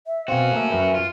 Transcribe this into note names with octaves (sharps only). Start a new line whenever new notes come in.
E5
B2 C4 C#4 F#4 F5
A3 A#3 E5
F#2 B4 E5 G5
F4